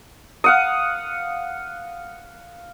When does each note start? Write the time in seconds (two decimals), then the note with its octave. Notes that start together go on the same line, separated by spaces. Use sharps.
0.44 F5 F#5 D#6